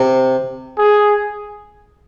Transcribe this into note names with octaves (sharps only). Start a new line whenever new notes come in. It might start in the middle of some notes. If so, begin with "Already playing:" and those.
Already playing: C3
G#4